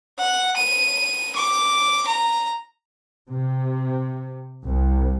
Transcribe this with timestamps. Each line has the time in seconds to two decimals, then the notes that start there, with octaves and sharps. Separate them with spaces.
0.19 F#5
0.57 D#7
1.36 D6
2.08 A#5
3.29 C3
4.64 C2